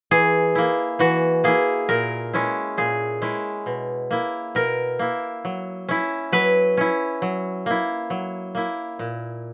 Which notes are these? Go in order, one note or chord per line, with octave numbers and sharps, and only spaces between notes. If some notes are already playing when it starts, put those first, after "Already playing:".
E3 G#4
A#3 E4
E3 F#4
A#3 E4 G#4
A#2 A#4
G#3 C#4 E4
A#2 G#4
G#3 C#4 E4
B2
A#3 E4
B2 A#4
A#3 E4
F#3
C#4 E4
F#3 B4
C#4 E4
F#3
A#3 E4
F#3
A#3 E4
A#2